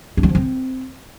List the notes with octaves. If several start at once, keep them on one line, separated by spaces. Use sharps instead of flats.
D4
G3
F3
C4